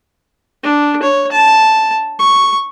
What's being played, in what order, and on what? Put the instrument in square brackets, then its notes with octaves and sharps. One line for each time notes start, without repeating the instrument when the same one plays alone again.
[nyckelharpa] D4
C#5
A5
C#6